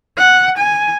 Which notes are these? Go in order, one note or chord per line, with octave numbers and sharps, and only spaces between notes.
F#5
G#5